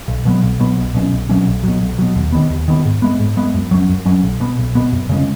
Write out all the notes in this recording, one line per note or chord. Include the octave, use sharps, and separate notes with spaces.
B1
B2 F#3 B3
B1
B2 F#3 B3
B1
B2 F#3 C#4
B1
B2 F#3 C#4
B1
B2 F#3
B1
B2 F#3
D#2
D#3 B3
D#2
D#3 B3
G#2
G#3 B3
G#2
G#3 B3
F#2
F#3 C#4
F#2
F#3 C#4
B1
B2 B3
B1
B2 B3
F#2
C#3 G#3 C#4